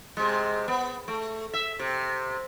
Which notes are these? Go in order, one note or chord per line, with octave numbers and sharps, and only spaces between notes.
C3 G#3
B3
A3
E5
C3